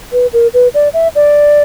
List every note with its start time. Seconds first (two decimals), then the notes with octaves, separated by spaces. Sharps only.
0.12 B4
0.33 A#4
0.54 B4
0.74 D5
0.94 E5
1.15 D5